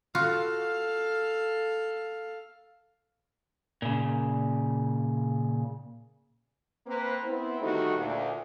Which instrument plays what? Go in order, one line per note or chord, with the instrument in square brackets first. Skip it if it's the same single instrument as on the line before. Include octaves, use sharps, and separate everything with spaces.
[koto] F4 F#4 [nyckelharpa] A4 F5
[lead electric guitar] A#2 C#3
[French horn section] A#3 C4 B4
B3 C4 E4
D2 D#3 G3 A3 D#4 F#4
D2 A#2